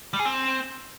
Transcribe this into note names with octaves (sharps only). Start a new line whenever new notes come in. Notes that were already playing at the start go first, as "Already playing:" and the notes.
G3
G#4
C4